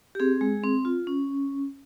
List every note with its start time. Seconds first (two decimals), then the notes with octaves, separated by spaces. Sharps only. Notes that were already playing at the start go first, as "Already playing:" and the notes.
0.15 G4
0.20 C4 G#4
0.41 G#3
0.64 C4
0.85 F4
1.07 C#4